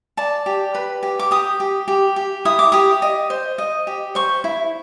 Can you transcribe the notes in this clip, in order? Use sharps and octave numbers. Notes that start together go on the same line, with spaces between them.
D5 A5
G4
B4
G4
D6
G4 D#6
G4
G4
G4
E4 D#6
D6
G4 D#6
D#5
C5
D#5
G4
C5 C#6
E4